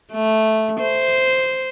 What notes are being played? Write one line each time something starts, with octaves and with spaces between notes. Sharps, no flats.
A3
C5